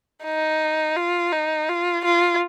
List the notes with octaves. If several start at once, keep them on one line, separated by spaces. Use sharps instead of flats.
D#4
F4
D#4
F4
F4